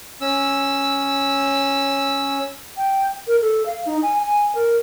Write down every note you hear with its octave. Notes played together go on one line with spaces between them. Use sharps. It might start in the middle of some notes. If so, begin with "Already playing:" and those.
C#4 E6
G5
A#4
A4
F5
D#4
G#5
G#5
A#4